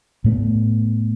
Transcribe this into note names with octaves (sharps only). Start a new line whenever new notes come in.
A2 A3 B3